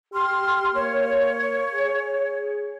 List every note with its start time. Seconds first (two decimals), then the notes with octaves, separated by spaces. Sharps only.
0.13 G4 C6 F6
0.74 A#3 C#5
1.74 G#4